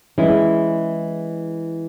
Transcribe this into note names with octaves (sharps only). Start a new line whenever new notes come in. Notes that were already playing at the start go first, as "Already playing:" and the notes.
E3 G#3 C#4 E4